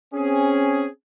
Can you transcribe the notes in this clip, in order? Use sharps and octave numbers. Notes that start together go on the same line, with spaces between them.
C4 C#4 G#4